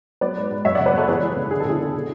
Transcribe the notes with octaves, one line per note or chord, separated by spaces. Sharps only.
F#3 B4 D5
G#2
G#2
F#2 C#5 E5
D5 F#5
C#3
B4 D5
F#2 A4 C#5
E3 G#4 B4
E3
C#3
D3 G#4
A4
D3 E4 G#4
D3
B2